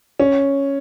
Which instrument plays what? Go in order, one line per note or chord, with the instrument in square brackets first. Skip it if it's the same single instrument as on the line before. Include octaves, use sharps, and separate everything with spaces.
[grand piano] C#4